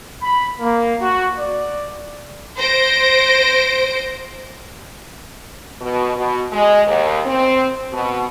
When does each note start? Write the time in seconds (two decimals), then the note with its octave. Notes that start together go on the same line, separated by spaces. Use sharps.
0.22 B5
0.60 A#3
1.01 F#4
1.36 D5
2.57 C5 A#6 D7
5.80 B2
6.16 B2
6.52 G#3
6.86 D#2
7.27 C4
7.92 B2